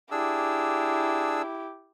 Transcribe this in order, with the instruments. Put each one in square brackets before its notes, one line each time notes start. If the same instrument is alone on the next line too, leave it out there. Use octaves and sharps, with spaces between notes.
[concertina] D4 G#4 E6 [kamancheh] E4 G4